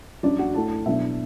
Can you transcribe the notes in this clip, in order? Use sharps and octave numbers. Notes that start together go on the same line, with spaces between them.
F#2 F#3 D4 D5
F#4 F#5
A2 A3 D4 A4 A5
B2 F#3 B3 D4 E4 E5